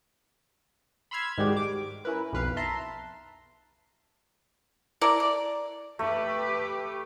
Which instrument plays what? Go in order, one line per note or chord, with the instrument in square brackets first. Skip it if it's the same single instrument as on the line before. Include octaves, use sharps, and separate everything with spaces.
[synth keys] B5 C6 E6 F6 G#6
G#2 D#3 G3 G#3 F#4 G4
D6
C#4 E4 A#4 B4
B1 F2 B4 F5
E5 A5 A#5 C6
[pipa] E4 A4 A#4 D5
D5
[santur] A3 [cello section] G4 B4